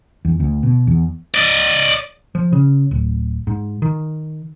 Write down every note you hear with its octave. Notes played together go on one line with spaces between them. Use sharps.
E2
D2
B2
E2
D5 D#5
F3
C#3
D1
G#2
D#3